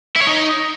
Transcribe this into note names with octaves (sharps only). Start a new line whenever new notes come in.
E4
C#5
D#4